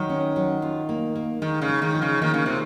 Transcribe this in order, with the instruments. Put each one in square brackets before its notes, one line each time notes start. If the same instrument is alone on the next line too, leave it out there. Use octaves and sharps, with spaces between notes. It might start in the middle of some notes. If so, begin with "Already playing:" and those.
Already playing: [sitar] D#3 [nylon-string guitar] F#3
[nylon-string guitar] C#4
F#3
F4
A#3
A#3
[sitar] D#3 [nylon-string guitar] G#3
[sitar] C#3
[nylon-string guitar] G#3
[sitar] D#3
[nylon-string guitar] F3
[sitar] C#3
[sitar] D#3 [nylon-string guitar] A#3
[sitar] C#3
[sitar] C3 [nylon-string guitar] F4